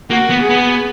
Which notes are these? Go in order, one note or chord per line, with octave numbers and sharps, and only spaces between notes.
A#3 F#4
B3
G#4
B3